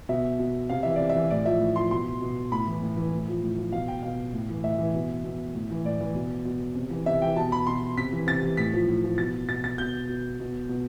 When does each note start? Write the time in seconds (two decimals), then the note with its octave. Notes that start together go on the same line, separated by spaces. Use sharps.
0.09 B2 E5
0.39 B2
0.69 C3 F5
0.83 E3 E5
0.96 C3 D5
1.09 E5
1.15 E3
1.30 A2 D5
1.45 F3 E5
1.60 A2
1.76 F3 C6
1.91 B2 C6
2.21 B2
2.52 A2 B5
2.67 E3
2.82 A2
2.97 E3
3.12 A2
3.28 F3
3.43 A2
3.58 F3
3.72 B2 F5
3.88 G5
4.03 B2 F5
4.33 A2
4.49 E3
4.63 A2 E5
4.79 E3
4.94 B2
5.24 B2
5.55 A2
5.70 E3
5.85 A2 D5
6.01 E3
6.15 B2
6.45 B2
6.75 C3
6.90 E3
7.06 C3 E5
7.22 E3 G5
7.36 B2 A5
7.52 B5
7.67 B2 C6
7.97 C3 B6
8.13 E3
8.27 C3 A6
8.42 E3
8.57 A2 B6
8.73 F3
8.88 A2
9.04 F3
9.18 B2 A6
9.49 B2 A6
9.64 A6
9.78 B2 G6
10.09 B2
10.40 B2
10.69 B2